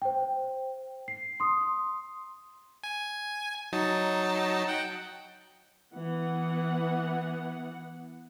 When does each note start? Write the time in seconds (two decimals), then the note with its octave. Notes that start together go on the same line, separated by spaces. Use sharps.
0.02 C5 G5
1.08 C7
1.40 C6 D#6
2.83 G#5
3.72 F#3 D#4 A5
4.68 F#5 G5
5.92 E3 B3 F#5